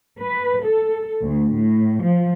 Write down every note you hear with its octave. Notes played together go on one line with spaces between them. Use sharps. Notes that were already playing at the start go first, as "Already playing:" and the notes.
B4
A4
D2
A2
F3